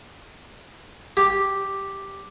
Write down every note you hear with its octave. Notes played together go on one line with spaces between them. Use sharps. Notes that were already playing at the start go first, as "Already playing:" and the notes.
G4